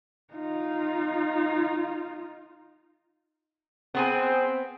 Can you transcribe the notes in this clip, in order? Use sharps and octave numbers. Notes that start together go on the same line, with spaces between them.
D#4 F4
B3 C4 G#4 G#5